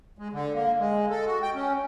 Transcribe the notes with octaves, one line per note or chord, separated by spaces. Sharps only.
G#3
D3
A#3
G#3
A4
F#4
G5
C#4